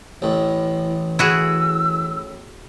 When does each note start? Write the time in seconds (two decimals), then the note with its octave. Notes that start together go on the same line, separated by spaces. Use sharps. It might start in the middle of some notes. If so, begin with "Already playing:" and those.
0.22 A1 A2 E3
1.19 E4 F#4 G#4 E6